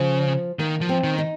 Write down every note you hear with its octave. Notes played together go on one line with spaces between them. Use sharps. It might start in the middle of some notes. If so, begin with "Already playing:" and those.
Already playing: C#3 F3
D#3 A#3
F3
C4
D#3
D#4